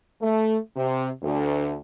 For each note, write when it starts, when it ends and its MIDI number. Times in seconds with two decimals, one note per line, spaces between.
0.21 0.57 57
0.76 1.09 48
1.23 1.76 38